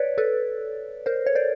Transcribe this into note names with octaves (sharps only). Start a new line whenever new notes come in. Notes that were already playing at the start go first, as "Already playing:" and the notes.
Already playing: B4 C#5 D5
A4 B4
A#4 C5
C#5
C5 D5